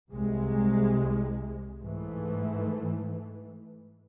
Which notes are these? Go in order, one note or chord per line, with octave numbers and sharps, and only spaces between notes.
C2 C3 G#3
G#2 E3 A3